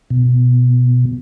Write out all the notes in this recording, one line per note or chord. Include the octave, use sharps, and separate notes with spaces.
B2